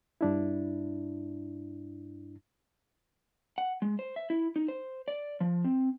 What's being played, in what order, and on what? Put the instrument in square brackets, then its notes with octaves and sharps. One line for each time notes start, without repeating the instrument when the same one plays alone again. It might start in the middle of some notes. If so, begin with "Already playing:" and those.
[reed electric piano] G2 D4 E4
[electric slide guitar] F#5
G#3
C5
E5
E4
D#4
C5
D5
F3
C4